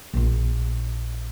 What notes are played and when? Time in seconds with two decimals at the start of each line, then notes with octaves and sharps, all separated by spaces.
0.14 A#1 F4